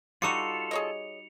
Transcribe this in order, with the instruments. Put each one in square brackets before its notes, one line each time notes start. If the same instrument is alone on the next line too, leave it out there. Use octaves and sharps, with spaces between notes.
[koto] G3 D#4 F#4 [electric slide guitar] F4 A4 [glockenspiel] C#7 F7
[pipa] G#4 C#5 D#5